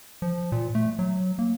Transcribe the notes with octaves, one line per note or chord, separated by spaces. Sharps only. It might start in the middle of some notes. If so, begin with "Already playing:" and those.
F3
A#2
A3
F#3
A#3